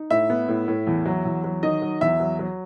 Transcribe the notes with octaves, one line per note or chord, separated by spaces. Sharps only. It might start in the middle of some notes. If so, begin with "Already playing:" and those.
Already playing: D#4
A2 E5
B3
A2
A2
E2
F#3
E2
F#3
D#3 D#5
F#3
E2 E5
F#3
F#3